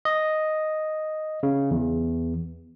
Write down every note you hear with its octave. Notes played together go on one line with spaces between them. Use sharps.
D#5
C#3
E2